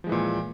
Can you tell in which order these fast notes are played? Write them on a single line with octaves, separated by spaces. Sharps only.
F3 G#3 E3 A#2